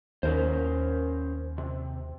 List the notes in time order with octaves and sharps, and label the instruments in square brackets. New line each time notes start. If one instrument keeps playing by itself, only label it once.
[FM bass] D#2 [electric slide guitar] C#4 A#4 C5
[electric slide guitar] C3